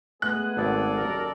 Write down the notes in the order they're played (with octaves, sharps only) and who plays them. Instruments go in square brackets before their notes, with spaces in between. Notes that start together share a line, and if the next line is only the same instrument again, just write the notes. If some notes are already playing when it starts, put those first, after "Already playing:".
[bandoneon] G#3 [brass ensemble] A3 B3 G#4 [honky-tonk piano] F#6
[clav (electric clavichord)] G#1 [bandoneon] A4 D5
[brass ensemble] F#1 D#2 A#4